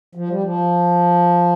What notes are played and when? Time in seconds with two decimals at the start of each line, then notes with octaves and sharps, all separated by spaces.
0.15 F3
0.29 G3
0.43 F3